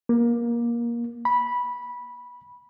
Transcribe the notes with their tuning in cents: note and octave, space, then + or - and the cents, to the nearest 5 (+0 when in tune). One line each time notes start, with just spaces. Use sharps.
A#3 +20
B5 -10